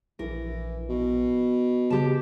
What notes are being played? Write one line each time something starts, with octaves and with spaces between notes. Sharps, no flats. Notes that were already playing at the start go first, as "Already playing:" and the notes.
A#1 E3 A#4
B2
C#3 G4 A5